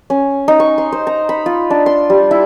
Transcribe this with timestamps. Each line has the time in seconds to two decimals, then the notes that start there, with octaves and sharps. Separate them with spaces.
0.10 C#4
0.48 D#4
0.60 C#6
0.78 C6
0.92 C5
1.07 A#5
1.29 B5
1.46 F4
1.70 D4
1.86 C6
2.10 G3
2.31 E4